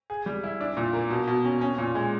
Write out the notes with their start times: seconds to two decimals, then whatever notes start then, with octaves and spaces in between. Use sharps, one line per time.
0.10 G#4
0.26 G3
0.44 E4
0.61 D4
0.77 A#2
0.93 A#3
1.10 B2
1.27 B2
1.45 C#4
1.61 C#4
1.78 A#2
1.95 G#3